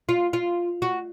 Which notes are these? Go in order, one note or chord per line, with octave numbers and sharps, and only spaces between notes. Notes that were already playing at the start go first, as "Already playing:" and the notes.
F4
F4
F#4